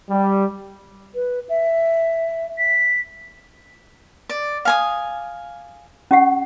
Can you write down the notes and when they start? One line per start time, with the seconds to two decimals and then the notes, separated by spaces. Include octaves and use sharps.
0.10 G3
1.15 B4
1.49 E5
2.58 B6
4.29 D5
4.65 F5 G#5 D#6
6.11 C#4 G4 F#5